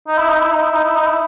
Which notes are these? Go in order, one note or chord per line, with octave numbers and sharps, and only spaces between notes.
D#4
E4
D#4
E4
D#4
E4
D#4
E4
D#4
E4